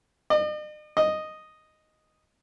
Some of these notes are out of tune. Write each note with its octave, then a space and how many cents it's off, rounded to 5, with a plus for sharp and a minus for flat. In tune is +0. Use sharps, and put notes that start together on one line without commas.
D#5 -45
D#5 -5